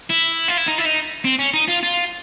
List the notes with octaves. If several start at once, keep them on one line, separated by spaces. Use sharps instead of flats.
E4
F4
E4
D#4
E4
D#4
C4
C#4
D#4
F4
F4